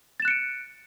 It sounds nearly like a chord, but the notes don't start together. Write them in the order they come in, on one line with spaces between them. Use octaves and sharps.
A6 E7 F#6 C#7 D7